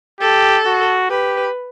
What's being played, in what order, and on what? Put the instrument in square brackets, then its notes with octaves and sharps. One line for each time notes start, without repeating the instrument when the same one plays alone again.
[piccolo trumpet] G4 [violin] A4
[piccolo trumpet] F#4
[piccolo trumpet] G4 [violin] B4